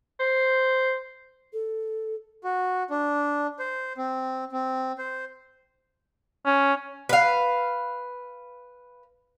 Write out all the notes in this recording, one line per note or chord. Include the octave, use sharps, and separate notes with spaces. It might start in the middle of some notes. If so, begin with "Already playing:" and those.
C5
A4
F#4
D4
C5
C4
C4
C5
C#4
B4 F5